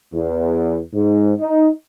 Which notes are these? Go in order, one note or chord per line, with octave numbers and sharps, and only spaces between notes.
E2
G#2
D#4